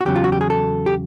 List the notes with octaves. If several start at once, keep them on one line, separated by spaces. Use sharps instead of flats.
F#4
E2 C#3 F#3 G4
F4
F#4
G4
G#4
A4
G4